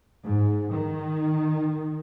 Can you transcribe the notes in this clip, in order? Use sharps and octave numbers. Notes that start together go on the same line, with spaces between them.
G#2
D#3